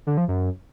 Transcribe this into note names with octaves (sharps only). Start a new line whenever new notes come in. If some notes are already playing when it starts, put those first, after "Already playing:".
D3
F3
F#2